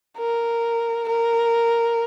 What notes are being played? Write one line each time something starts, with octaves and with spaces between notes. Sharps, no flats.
A#4
A#4